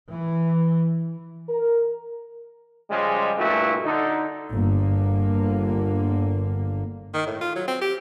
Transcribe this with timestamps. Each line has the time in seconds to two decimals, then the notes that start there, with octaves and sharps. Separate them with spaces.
0.10 E3
1.49 A#4
2.90 C#3 F3 G3 G#3
3.38 G2 A#2 A3 E4 F#4
3.84 D3 D#4
4.51 G1 D3 A#3
7.14 D#3
7.26 A2
7.41 F4
7.56 F#3
7.68 C4
7.82 G4